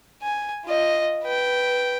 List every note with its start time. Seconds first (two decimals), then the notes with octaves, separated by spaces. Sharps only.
0.23 G#5
0.65 F4 D#5
1.23 B4 G5